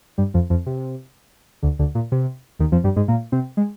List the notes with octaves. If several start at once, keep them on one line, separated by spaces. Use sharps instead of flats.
G2 G3
F2 F3
F2 F3
C3
D2 D3
D2 D3
A#2
C3
D#2 D#3
F2 F3
G2 G3
G#2 G#3
A#2 A#3
C3 C4
G#3